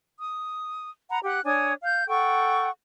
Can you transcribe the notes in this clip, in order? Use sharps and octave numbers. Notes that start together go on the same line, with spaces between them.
D#6
F#5 A#5 B5
G4 F#5 F#6
D4 C#5 G#5 D#6
F5 G6
A4 F#5 G5 C#6